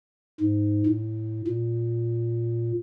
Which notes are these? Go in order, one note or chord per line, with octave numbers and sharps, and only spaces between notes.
G#2
A2
A#2